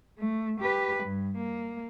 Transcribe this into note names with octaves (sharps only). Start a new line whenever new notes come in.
A3
G4 B4
G2
A#3